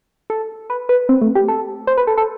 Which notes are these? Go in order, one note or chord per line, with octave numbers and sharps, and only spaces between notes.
A4
B4
B4
C4
A3
G4
A4
C5
B4
A4
A4